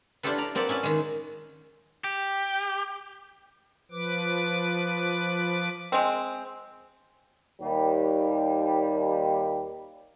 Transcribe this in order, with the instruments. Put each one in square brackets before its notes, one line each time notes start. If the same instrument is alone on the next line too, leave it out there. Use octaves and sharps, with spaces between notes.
[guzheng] D4 E4 F4 G4 A4 B4
D5 A#5
A#3 C4 B4 D5 F#5 A5
C#4 E4 B4 A5
D#3 G#3
[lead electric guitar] G4
[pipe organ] F3 B4 D6
[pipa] G#3 C4
[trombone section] D#2 G3